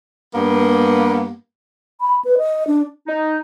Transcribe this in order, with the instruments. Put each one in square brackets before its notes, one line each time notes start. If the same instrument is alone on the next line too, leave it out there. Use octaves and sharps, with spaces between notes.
[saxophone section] G2 A#3 B3
[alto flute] B5
B4
D#5
D4
[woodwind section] D#4